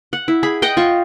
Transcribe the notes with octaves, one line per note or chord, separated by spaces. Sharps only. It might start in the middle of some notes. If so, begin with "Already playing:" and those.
F#5
E4
G#4 B5
D#5 F#5 G5
F4 C#6